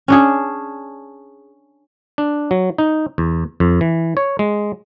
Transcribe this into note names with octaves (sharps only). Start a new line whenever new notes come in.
C#4 D4 G#4
D4
F#3
D#4
E2
F2
E3
C#5
G#3